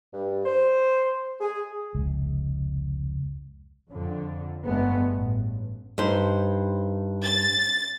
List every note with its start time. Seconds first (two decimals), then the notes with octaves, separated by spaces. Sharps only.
0.14 G2
0.46 C5
1.41 G#4
1.95 F1 C#2
3.91 F2 D3
4.66 G1 G2 G#3 A3 B3
5.14 A1
5.98 G2 D#4 C5
7.24 A6